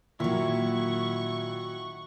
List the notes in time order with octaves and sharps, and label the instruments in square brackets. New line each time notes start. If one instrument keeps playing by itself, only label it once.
[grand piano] A#2 [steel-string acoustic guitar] D#3 F#3 [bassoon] E4 [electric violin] F#5 C#6